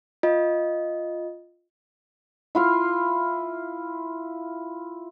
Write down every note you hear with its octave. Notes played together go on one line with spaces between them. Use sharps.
F4 D#5
E4 F4 F5